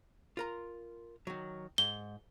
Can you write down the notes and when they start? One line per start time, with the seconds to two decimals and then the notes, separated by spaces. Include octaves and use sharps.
0.37 F4 A#4 A#5
1.27 D#3 F#3
1.78 G#2 G7